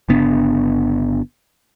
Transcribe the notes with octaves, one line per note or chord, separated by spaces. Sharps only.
G1 C#3 B3 D4